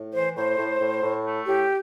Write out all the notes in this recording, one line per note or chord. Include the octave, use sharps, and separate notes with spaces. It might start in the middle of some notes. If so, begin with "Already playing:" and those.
Already playing: A2
E3 C5
A2 C5
A2
A2
A2
A3
A2 G4